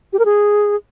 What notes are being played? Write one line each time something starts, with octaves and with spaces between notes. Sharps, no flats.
G4
A#4
G#4